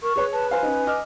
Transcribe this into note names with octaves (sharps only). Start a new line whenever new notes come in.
A#4 C#6
G#4 B4 C#5
B4 A5
C5 F5 G#5
C#4 D#4
D#5 D6 F6